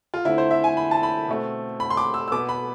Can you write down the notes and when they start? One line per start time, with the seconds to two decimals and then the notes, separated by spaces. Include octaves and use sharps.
0.14 F4
0.25 D3 A3 C4 E4
0.38 C5
0.51 E5
0.64 G#5
0.77 B5
0.91 A5
1.03 B5
1.28 B2 A3 C4
1.80 B5
1.90 C6
1.97 D6
2.14 E6
2.28 E6
2.32 B2 B3 D6
2.49 B5